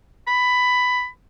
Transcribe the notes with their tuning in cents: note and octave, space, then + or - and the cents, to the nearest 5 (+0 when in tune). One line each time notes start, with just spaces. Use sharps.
B5 +10